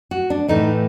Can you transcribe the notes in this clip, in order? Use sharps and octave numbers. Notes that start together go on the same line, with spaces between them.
F#4
D4
A2 E3 A3 D#4